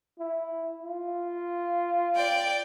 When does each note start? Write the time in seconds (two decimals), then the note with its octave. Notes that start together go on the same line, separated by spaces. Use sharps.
0.19 E4
0.83 F4
2.15 D5 G5